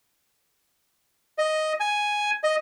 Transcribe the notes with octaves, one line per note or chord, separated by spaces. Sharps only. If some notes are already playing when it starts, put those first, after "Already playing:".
D#5
G#5
D#5